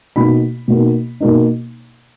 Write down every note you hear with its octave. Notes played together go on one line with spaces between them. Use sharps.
B2 A#3 D#4 B5
B2 A#3 D#4
B2 A#3 D#4